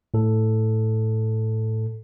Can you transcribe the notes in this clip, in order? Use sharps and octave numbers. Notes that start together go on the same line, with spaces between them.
A2 A4